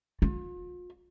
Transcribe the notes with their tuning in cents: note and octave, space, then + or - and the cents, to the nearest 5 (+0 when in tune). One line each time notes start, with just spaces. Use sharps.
F4 +40